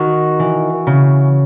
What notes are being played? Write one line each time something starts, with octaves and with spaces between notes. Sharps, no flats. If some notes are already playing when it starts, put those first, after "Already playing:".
Already playing: D#3 F#4
E3
C#3